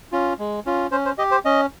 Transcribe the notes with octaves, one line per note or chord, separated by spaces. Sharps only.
C#4 F4
G#3
C#4 F4
C#4 C5
C5
G4 D#5
C5
C#4 D#5